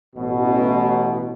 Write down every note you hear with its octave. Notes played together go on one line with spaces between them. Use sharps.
A1 B2